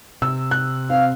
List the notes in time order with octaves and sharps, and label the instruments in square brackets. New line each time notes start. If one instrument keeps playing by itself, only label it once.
[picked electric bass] C3 [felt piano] E6
[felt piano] F#6
[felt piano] C4 [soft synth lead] F5